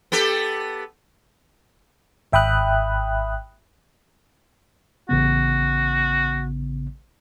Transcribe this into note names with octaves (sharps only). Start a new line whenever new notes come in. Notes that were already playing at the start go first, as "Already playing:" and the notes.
B3 G4 A4
G#1 E5 G5 B5 D#6 F#6
A1 C#3 B3 F#4